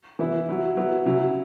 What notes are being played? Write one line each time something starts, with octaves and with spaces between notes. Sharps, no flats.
E3 B3 E4
F#3 E4
F#3 B3 E4
C#3 F#3 E4